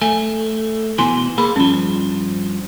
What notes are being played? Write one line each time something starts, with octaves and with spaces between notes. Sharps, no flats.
A3 G#5
B2 E3 G#5 C6
A#3 G#4 B5
G2 F3 C#4